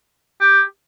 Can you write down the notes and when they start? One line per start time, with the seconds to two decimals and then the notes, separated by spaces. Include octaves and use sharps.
0.41 G4